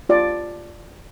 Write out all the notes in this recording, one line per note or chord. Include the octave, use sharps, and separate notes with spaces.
F4 D5